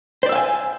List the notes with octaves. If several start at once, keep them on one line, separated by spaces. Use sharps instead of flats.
C5 D5 E5 F5 G#5